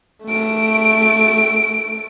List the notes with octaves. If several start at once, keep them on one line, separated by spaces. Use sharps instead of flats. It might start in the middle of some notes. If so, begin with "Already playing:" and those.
A3 D7